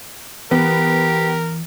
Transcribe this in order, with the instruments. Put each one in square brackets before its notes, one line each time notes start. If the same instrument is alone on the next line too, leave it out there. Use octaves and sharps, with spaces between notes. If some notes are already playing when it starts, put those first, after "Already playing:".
[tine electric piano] E3 [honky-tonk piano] B3 [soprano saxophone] G4 [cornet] A#4